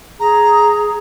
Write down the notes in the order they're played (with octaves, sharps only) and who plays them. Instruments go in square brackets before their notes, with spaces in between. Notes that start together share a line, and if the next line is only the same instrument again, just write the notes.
[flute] G#4 [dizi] A#5